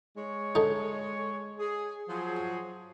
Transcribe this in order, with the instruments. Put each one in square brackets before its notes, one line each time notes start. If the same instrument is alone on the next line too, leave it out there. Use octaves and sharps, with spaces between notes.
[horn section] G#3 C#5
[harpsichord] D3 D#4
[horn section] G#4
F3 F#3 G#4